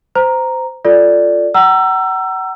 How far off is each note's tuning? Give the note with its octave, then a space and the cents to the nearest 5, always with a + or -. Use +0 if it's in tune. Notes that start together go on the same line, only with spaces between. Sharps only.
C5 -25 A#5 +0
F4 +0 A4 +0 D5 +0
F#5 +35 A#5 +0 E6 +25